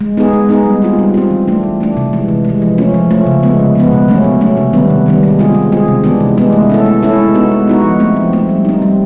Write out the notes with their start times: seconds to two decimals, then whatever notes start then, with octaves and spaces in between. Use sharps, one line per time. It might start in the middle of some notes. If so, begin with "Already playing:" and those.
0.01 G#3
0.17 B3 D#4 G#4
0.33 G#3
0.49 B3 D#4 G#4
0.66 G3
0.82 C4 F4
0.98 G3
1.14 C4 F4
1.31 E3
1.48 A3 D4
1.63 E3
1.81 A3 D4
1.97 C3
2.13 E3 G#3
2.28 C3
2.45 E3 G#3
2.62 F3
2.78 A3 C#4 F4
2.94 F3
3.11 A3 C#4 F4
3.26 C#3
3.43 F3 G#3 B3
3.59 C#3
3.75 F3 G#3 B3
3.92 B2
4.08 F#3 A3 C#4
4.24 B2
4.41 F#3 A3 C#4
4.57 C3
4.73 D#3 G3 B3 D4
4.90 C3
5.06 D#3 G3 B3 D4
5.23 G#3
5.39 C4 F4 G#4
5.55 G#3
5.72 C4 F4 G#4
5.88 C3
6.04 E3 G#3 B3 D4
6.20 C3
6.37 E3 G#3 B3 D4
6.53 A3
6.70 C#4 E4 A4
6.86 A3
7.03 C#4 E4 A4
7.18 G#3
7.35 B3 D#4 F#4
7.52 G#3
7.67 B3 D#4 F#4
7.83 F3
8.00 A3 C4
8.16 F3
8.33 A3 C4
8.49 G3
8.65 C4 D#4
8.82 G3